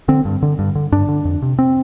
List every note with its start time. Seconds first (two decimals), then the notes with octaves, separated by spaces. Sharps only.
0.08 D3 C4
0.25 G2
0.43 D3
0.59 G2
0.75 D3
0.92 G2 D4
1.09 D3
1.25 F2
1.42 C3
1.59 C4